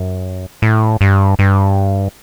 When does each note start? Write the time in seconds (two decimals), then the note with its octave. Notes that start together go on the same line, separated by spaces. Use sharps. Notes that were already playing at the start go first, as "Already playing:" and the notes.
Already playing: F#2
0.62 A2
1.01 G2
1.39 G2